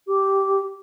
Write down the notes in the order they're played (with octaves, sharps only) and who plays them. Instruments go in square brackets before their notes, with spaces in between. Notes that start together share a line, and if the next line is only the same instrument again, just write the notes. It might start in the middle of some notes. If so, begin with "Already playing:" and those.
[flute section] G4 D6